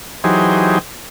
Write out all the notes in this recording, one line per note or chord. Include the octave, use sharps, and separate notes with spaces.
E3 F#3 D#4 G4 G#4 C5